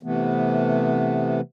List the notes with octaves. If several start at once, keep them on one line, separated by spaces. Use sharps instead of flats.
C3 E3 A3 B3